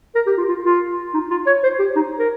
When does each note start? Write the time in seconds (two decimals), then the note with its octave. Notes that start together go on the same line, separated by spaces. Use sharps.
0.15 A#4
0.27 G4
0.38 F4
0.49 F4
0.65 F4
1.14 D#4
1.30 F4
1.46 C#5
1.63 C5
1.79 G4
1.96 D#4
2.19 A#4